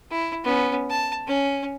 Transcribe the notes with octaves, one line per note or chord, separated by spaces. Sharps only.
E4
B3 C#4
A5
C#4